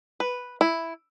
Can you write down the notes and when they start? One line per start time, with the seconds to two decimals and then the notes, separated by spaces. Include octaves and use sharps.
0.20 B4
0.61 E4